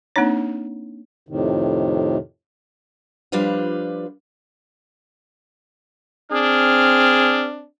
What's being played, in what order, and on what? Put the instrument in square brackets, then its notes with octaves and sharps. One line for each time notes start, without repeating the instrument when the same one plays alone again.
[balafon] A#3 C4 D4 D#4 C#5
[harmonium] F2 A2 C3 D#3
[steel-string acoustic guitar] F3 G3 D4 F4 B4 F5
[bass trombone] C4 [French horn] D4 [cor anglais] G#4 [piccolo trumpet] F6